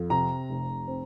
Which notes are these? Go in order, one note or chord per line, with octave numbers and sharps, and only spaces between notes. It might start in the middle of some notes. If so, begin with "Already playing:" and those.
Already playing: F2
C3 A#5
F1
C4